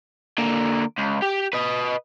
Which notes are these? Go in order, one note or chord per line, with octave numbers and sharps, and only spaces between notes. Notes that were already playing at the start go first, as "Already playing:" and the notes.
D3 A#3
C#2
G4
B4 D#5